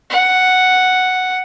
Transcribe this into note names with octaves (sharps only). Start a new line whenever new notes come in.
F#5